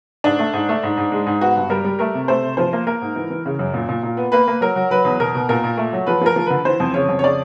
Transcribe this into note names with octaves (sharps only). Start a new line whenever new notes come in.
G#2 D4
A3
G#2
A3
G#2
G#2
G#3
G#2
B3 F#4
G2
G3 A#4
G3
A3 A#4
C3
A3 C5
C3
F3 C5
A#3
A#3 A#4
G#2
E3
E3
C#3
F#2
A#2
A#2
A#2
B3
A#3 B4
A#3
F#3 A#4
F#3
F#3 B4
E2
B2 A#4
B2
A#2 A#4
A#2
A3
F#3
F3 B4
F3 A#4
F3
D3 B4
E3 C5
F2
C#3 C#5
F2
C#5
C#3 D5